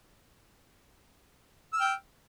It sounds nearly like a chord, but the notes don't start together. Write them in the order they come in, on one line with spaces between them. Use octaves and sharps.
E6 F6 G5